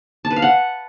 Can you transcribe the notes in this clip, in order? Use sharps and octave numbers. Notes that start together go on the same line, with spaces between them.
A5
B4
F5
F#5